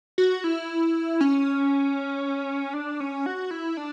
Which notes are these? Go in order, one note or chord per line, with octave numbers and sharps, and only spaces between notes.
F#4
E4
C#4
D4
C#4
F#4
E4
D4